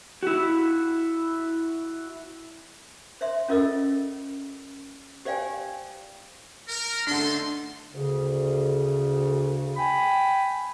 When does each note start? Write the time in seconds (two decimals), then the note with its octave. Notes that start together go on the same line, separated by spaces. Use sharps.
0.23 E4 F#4
3.21 C5 E5 C6
3.48 C#4 F4 A4 A#4 D#5 E6
5.25 G4 C5 D5 F5 G5 G#5
6.68 A#4
7.07 D3 A3 D4 D#4 A4 C6
7.92 D2 C#3
9.76 G5 G#5 B5